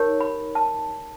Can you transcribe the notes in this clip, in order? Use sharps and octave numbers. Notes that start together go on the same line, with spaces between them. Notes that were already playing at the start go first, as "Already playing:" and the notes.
Already playing: D#4 G4 A#4 C#5
B5
A5